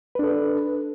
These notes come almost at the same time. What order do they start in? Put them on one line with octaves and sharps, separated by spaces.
B4 D4 A4